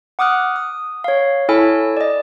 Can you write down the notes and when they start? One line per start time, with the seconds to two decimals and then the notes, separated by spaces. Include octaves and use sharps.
0.19 F#5 D6 D#6 F6 F#6
0.56 D#6
1.04 C#5 F5
1.49 E4 A4 C#5 G#5 E6
1.97 D5 D#5